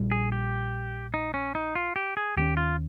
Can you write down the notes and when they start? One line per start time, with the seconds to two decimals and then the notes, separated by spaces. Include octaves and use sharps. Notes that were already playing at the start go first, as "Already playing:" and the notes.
Already playing: A#1 A#2 G3
0.11 G#4
0.32 G4
1.14 D#4
1.34 C#4
1.55 D#4
1.75 F4
1.96 G4
2.17 G#4
2.36 D#2 D#3 A#3 C#4 G4
2.57 F4